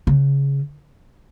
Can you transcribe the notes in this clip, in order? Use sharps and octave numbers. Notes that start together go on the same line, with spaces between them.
C#3